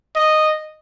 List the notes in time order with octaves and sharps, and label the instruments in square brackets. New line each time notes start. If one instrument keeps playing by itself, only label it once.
[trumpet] D#5